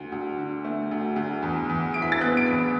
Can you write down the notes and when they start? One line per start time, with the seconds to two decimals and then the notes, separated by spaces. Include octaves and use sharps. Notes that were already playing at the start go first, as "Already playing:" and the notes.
Already playing: D2
0.12 D2
0.38 D3
0.65 A3
0.91 D2
1.16 D2
1.42 E2
1.69 E2
1.94 E3 D7
2.02 B6
2.12 A6
2.20 B3 F#6
2.37 D7
2.46 E2 B6